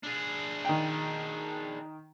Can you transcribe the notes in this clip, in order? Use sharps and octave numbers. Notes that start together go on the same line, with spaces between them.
D4 G#4
D#3 G5